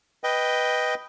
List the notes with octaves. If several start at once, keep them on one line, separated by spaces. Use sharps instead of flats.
B4 D#5 G5